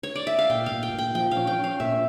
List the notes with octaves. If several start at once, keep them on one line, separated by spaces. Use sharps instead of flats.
C#5
D5
E5
F5
A#2 G5
F5
A#2
G5
A#2 G5
F3 G5
F5
C#4
G5
C#4
F5
A#2 E5